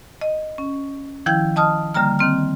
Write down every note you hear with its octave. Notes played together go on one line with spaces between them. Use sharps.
D#5
C#4
D#3 F3 E4 G5 G6 G#6
D#5 A5 D#6 F6
D3 G3 A#3 A#5 F6
D#3 C4 F6